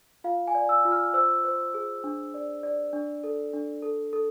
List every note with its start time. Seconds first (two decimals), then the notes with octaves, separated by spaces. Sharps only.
0.24 F4 F5
0.47 G#5
0.55 D5
0.69 E6
0.85 F4
0.92 F6
1.14 C5 E6
1.44 C5
1.74 G#4
2.04 D4
2.34 D5
2.63 D5
2.93 D4
3.24 A4
3.53 D4
3.82 A4
4.13 A4